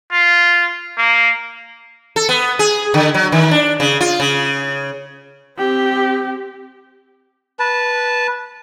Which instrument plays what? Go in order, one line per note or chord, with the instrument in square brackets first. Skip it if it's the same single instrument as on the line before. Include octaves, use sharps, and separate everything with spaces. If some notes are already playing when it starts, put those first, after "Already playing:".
[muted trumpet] F4
A#3
[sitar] A4
B3
G#4
D3
F#3
D#3
D4
C#3
F4
C#3
[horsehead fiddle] C4 G4
[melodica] B4 A5